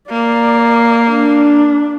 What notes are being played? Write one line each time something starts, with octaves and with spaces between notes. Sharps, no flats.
A#3 D5
D4